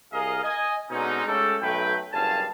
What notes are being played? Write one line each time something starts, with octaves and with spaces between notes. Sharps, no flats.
C2 G#4 A#4 D#5 F5
D#5 G#5
B2 D3 G#3 C4 C#4 D#4
G#3 A3 C#4 F#4 G4 A4
B1 F#3 A3 B4 G5
F#1 B1 G2 F5 G#5 A5